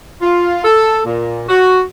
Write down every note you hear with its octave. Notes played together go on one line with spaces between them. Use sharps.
F4
A4
A#2
F#4